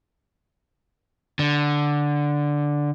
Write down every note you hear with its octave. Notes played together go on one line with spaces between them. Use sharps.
D3